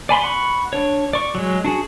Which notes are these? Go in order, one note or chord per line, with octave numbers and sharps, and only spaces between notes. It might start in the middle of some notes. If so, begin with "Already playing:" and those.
D5 G#5 B5 C6
F#5 B5 C#6
D4 C#5
D5 C#6
F#3 G#3
D4 F#4 G#4